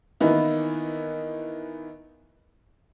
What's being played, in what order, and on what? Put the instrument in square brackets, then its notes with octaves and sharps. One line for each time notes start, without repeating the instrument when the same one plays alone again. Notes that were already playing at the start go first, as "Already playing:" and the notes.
[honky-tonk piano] D#3 E3 A#3 B3 D#4 E4